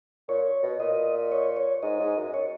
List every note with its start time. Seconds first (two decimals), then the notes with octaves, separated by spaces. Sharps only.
0.28 A#2 C#5
0.63 B2
0.79 A#2 D#5
1.32 C#5
1.57 C#5
1.83 G#2 D#5
2.00 G#2
2.17 F#2
2.34 C#5